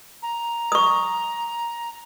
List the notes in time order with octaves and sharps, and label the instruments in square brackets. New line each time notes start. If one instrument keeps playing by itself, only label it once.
[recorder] A#5
[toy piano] C#6 D#6